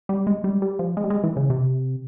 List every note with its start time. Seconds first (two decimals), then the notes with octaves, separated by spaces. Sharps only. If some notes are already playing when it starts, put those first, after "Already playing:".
0.09 G3
0.27 G#3
0.44 G3
0.62 G3
0.79 F3
0.97 G#3
1.04 G3
1.10 G#3
1.24 E3
1.37 C#3
1.50 C3